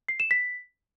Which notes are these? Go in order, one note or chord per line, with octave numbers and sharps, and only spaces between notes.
C7
E7
B6